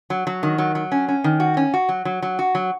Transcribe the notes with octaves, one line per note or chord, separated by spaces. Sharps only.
F#3
F#3
D#3
F#3
F#3
C#4
C#4
D#3
F#4
C#4
F#4
F#3
F#3
F#3
F#4
F#3